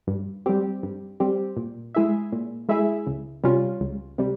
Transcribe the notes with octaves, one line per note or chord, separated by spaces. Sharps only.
G2
G3 C4 G4
G2
G3 C4 G4
A#2
G#3 E4 G#4 E5
A#2
G#3 E4 G#4 E5
C#2
C3 G3 C#4 F4
C#2
C3 G3